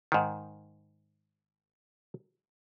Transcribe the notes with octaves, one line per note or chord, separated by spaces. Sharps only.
G#2 D#3